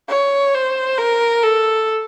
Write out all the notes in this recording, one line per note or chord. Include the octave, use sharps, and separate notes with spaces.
C#5
C5
A#4
A4